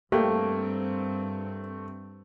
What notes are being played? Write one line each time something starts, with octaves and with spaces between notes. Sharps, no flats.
G2 A3 A#3 C4 G4